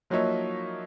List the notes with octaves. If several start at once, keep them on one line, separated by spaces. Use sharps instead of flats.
F3 F#3 A#3 D#4 C#5 E5